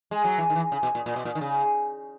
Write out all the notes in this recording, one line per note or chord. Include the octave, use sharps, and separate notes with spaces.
G#3
F#3
E3
D#3
E3
C#3
B2
A#2
A#2
B2
A#2
D#3
C#3